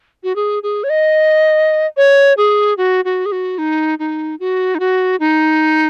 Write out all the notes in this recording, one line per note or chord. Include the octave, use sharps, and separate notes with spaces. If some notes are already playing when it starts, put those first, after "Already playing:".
F#4
G#4
G#4
C#5
D#5
C#5
G#4
F#4
F#4
G#4
F#4
D#4
D#4
F#4
D#4
F#4
D#4